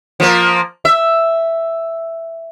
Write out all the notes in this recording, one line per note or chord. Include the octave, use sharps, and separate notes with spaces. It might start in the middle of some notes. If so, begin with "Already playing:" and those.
F3 A#3
E5